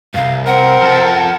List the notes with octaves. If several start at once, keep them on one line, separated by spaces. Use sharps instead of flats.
C2 G2 F5
C4 A#4 F#5
F3 A4